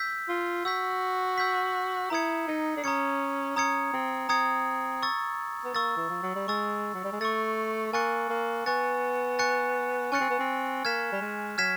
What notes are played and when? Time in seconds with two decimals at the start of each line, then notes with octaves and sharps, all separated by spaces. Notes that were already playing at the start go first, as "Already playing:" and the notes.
Already playing: E6 G6 B6
0.28 F4
0.65 F#4 E6 G6 B6
1.38 E6 G6 B6
2.10 E4 A#5 D#6 G#6 C#7
2.47 D#4
2.77 D4
2.84 C#4 A#5 D#6 G#6 C#7
3.56 C#4 A#5 D#6 G#6 C#7
3.93 C4
4.29 C4 A#5 D#6 G#6 C#7
5.03 C#6 E6 A6
5.65 B3
5.74 A#3 C#6 E6 A6
5.96 E3
6.09 F3
6.22 F#3
6.35 G3
6.48 G#3 C#6 E6 A6
6.94 F#3
7.04 G3
7.12 G#3
7.20 A3 C#6 E6 A6
7.93 A#3 G#5 C#6 F#6 A6 C#7
8.30 A#3
8.66 B3 G#5 C#6 F#6 A6 C#7
9.39 G#5 C#6 F#6 A6 C#7
10.12 C#4 G#5 C#6 F#6 A6 C#7
10.20 C4
10.30 B3
10.39 C4
10.85 A#3 F6 G#6 B6 E7
11.12 G3
11.21 G#3
11.58 F#3 F6 G#6 B6 E7